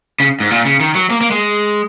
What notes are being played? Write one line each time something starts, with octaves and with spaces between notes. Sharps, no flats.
C#3
G#2
A#2
C#3
D#3
F#3
A#3
A#3
G#3